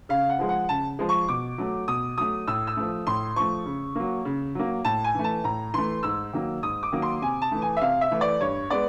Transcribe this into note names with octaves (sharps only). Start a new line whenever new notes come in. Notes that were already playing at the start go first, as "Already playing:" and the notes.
C#3 F5
F#5
F3 G#3
F#5
C#3 A5
F3 G#3
C#6
B2 D6
F#3 A3
B2 D#6
F#3 A3 D#6
A2 E6
E6
F3 A3
A2 C6
F3 A3 C#6
C#3
F#3 A#3
C#3
F#3 A#3
A2 A5
G#5
E3 A3
A5
A2 A#5
E3 A3 C6
G#2 E6
D#3 F#3 A#3
G#2 D#6
D6
D#3 F#3 A#3
C6
C3 G#5
A5
E3 A3
G#5
E5
C3 F5
E5
E3 A3
D5
G2 C#5
G#3 B3 D5